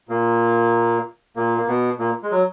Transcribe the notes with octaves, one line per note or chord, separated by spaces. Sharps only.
A#2 A#3
A#2 A#3
A#3
B2 B3
A#2 A#3
G#3
F#3